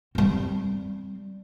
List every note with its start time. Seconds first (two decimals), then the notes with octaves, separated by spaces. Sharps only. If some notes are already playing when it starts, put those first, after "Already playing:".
0.15 G3 C4